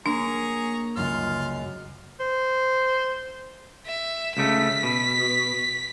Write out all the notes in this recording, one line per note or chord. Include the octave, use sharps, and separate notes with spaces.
A#3 D4 G#4 C#5 A#5
C#2 F#2 F4 F6
C5
E5
C#2 C#3 A3 B6
B2